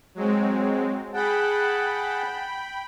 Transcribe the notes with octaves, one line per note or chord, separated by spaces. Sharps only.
F#3 G#3 C4
G#4 F#5 G5 A5 B5